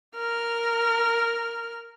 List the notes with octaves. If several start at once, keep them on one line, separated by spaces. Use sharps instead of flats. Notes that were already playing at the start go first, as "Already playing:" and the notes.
A#4 F6